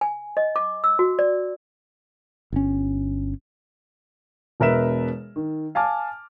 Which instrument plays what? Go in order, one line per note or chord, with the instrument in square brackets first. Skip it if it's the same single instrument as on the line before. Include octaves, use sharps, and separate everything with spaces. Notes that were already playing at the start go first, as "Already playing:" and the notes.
[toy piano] G#5
D#5
D6
E6
F#4
D5
[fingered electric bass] G1 C#4
[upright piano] E1 B2 A#4 B4 E5 E7
D#3
F5 G#5 A5 D6 F6